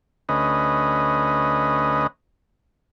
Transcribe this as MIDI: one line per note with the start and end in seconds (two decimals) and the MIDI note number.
0.29 2.07 38
0.29 2.07 61
0.29 2.07 71
0.29 2.07 75